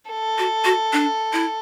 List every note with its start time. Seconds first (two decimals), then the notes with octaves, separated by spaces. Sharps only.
0.11 A4
0.38 F#4
0.64 F#4
0.93 D4
1.33 E4